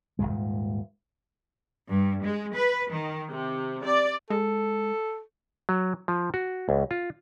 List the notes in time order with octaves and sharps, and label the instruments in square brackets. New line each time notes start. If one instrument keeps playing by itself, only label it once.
[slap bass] D#1 D#2 G#2 G#3
[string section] G2
G#3
B4
D#3
C3
D5
[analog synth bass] G#3 [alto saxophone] A4
[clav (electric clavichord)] F#3
F3
F#4
C#2
F4